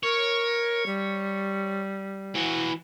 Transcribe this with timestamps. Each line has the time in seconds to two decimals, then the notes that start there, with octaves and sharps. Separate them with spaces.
0.03 A#4 C#5
0.86 G3
2.35 E3 F#4